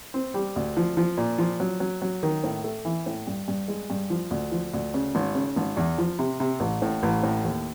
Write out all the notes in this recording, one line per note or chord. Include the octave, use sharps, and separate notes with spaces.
C4
G3
D2
F3
F3
A#2
F3
F#3
F#3
F#3
D#3
A2
A3
E3
A2
G2
G2
G#3
G2
F3
D2
F3
D2
C#3
G#1
C#3
G#1
E2
F3
C3
C3
A1
A2
A1
A2
D#2